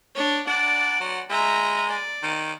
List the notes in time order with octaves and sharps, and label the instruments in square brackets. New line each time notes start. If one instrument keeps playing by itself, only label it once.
[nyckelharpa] D4 C#5
[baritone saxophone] D4 [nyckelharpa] D5 F#5
[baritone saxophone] F#3
[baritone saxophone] G#3 [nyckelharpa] E5 A#5
[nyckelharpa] D5
[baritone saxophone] D#3